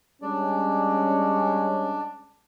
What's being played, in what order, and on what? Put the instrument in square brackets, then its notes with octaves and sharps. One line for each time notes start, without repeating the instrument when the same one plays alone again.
[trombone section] G3 G#3 C#4 [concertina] D4 D5